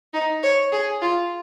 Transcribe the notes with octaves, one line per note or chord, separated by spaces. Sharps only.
D#4
C#5
G#4
F4